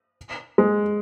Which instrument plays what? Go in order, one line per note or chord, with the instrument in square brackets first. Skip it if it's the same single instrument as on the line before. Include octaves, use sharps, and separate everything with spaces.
[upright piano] G#3